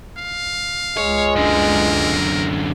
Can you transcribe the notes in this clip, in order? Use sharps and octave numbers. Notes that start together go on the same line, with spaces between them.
F5
C#2 G#3 C#5
F#2 D3 A#4